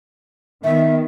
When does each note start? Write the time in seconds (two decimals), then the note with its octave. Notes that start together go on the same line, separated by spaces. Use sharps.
0.64 D#3 B3 E5